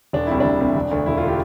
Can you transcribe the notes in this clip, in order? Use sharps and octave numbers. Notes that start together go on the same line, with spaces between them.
E1 D4
D2 C3 G3 E4
E1 D4
D2 C3 G3
E1
D2 D3
E1 E4
F4
D3 G4